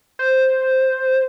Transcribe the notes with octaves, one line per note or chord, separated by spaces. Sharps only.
C5